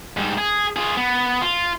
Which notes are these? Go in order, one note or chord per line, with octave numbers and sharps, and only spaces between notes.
G#2 G3
G#4
F4 G#4
B3
F4